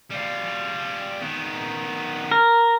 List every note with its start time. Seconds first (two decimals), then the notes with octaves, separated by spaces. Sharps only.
0.10 G3 F4
1.21 D#3 B3
2.31 A#4